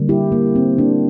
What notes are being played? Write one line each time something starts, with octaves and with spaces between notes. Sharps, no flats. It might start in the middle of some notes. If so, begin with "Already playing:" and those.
Already playing: D3 G3 A#3
E4 G4
A#3
C4
A#3 D4